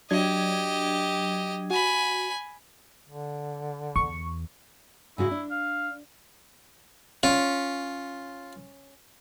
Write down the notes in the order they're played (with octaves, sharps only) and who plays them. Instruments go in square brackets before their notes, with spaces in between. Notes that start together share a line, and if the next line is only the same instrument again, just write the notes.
[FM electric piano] F#3 D4 G#6 [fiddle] G4 D#5
[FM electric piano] F#4 [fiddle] G#5 B5
[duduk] D3
[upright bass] E2 [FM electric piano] C#6
[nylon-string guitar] G#2 C#3 F#4 [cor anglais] E4
[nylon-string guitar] D4
[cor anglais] F5
[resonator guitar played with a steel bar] C#4 [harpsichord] F4